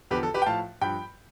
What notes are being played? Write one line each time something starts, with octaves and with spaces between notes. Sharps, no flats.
E2 D3 F3 G4 B4
A4
G4 B4
G5
A2 F3 F5 A5
G2 F3 G5 B5